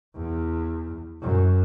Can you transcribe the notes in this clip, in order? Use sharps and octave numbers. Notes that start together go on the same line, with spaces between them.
E2
F#2